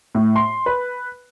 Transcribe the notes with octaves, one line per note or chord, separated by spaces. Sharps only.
A2
C6
B4